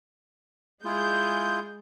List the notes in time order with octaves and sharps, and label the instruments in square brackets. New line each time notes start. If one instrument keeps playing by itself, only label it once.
[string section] G#3 G6 [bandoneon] E4 F4 G#4